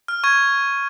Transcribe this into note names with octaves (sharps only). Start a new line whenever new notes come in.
F6
C#6 G#6